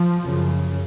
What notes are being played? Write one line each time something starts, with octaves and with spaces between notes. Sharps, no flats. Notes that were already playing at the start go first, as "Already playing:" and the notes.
Already playing: F3
F#2 C#3